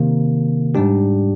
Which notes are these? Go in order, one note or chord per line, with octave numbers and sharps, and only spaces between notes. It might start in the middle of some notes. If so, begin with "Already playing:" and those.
Already playing: C3 D#3 A#3
G#2 G3 D4 G4